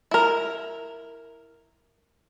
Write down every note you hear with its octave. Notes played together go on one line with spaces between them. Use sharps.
E4 A#4